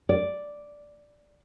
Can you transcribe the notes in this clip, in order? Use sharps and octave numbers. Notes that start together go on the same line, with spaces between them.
D5